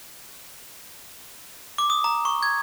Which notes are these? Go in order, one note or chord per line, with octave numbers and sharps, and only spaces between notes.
D6
D#6
A#5
C#6
G#6